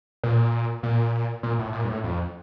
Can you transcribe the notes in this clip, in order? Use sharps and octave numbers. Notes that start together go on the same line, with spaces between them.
A#2
A#2
A#2
A2
A#2
G2
A2
F2